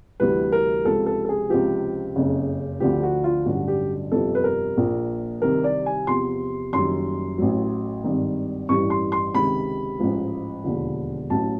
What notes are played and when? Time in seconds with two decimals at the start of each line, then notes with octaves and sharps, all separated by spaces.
0.20 D2 C3 E3 G3 B4
0.52 A#4
0.84 C#2 C3 F3 A4
1.06 A4
1.25 A4
1.29 G#4
1.50 C#2 C3 F3 G4
2.16 F#1 F2 C#3
2.80 D2 D3 F3 G4
3.03 F#4
3.24 F4
3.46 A1 G2 D3 F#3 F#4
3.68 G4
4.12 G1 F2 C3 F3 A4
4.35 B4
4.44 A#4
4.77 A#1 A#2 F3
5.42 C2 C3 D#3 G3 A#4
5.64 D5
5.86 G#5
6.07 E2 C3 F3 C6
6.73 F#1 F#2 D#3 G3 C6
7.38 A1 A2 F#3
8.04 G#1 G2 D#3
8.69 A1 G2 E3 G3 C#6
8.90 C6
9.12 C6
9.34 C#2 C3 D#3 B5
10.00 A1 G#2 F3
10.64 E1 D#2 D3 F3
11.30 A1 A2 F#3 A5